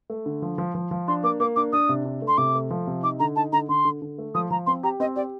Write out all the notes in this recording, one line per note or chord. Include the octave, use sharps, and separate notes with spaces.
A3
D3
F3
F3
F3
F3
D4 C6
A#3 D6
A#3 D6
D4 D6
D4 D#6
C3
D4
A3
C6
C3 D6
A3
F3
C3
D#4 D6
D3 A#5
D#4 A5
D3 A#5
D3 C6
D3
D3
A3
F3 D#6
F3 A#5
C4 C6
G4 A#5
C4 D#5
G4 D5